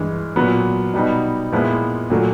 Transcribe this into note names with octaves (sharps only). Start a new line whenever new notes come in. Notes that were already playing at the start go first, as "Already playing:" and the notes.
Already playing: G2 E3 G#3
A#2 F#3 B3
B2 G3 B3 D#4
A#2 F3 G#3 B3 E4
A#2 F#3 A3